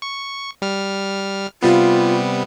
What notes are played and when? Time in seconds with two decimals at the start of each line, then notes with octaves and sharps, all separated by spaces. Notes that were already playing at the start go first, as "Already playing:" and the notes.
0.02 C#6
0.62 G3 F6
1.62 C3 G3 B3 F4